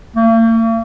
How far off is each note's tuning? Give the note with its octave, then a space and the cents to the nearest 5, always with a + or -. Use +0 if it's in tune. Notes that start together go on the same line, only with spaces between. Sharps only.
A#3 -45